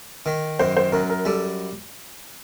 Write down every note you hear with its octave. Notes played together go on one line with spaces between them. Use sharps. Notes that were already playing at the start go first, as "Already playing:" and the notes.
D#3
F#2 C5
C5
F#2 A#4
A#4
G3 A4